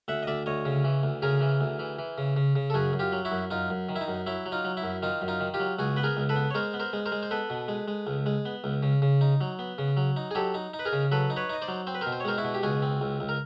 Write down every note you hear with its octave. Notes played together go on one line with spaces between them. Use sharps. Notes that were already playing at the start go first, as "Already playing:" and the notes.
D2 E5 F#5
D#5
D2 D5 E5
D2 C#5 D#5
C#3
E3
D2
C#3 G#4 A#4
E3
D2
E3
E3
C#3
C#3
C#3
A4
F#2 F#4 G#4
F#2
F4 G4
F#3
E4 F#4
F#2
F#2 D#4 F4
F#2
D#3
E4
D#4
F#2
F#3 E4
F#3
D#4 F4
F#3
E4
F#2
D#3 D#4 F4
F#2
D#4 F4
D#3
F4 G4
F#3
C#2 F#4 G#4
B3 B4
G#4 A#4
C#2
A4 B4
B3
C#5
G#3 A#4 C5
B3
A#4 C5
G#3
A#4 C5
G#3
C5
B3 A4 B4
B2
G#3
G#3
C#2
G#3
B3
C#2
C#3
C#3
D#4
F#3
B3
C#3
F#3
D#4
G#4
F#3 G4 A4
D#4
D#4
B4
G#4 A#4
C#3
F#3 A4 B4
D#4
B4 C#5
D#4 D#5
C5 D5
F#3
C4 C5
B4
A#4 C5
B2
C5
C#5
G#3 A#4 C5
E4 F#4
B2
G4
C#2 F#4 G#4
C4
C#2
C#2
A#4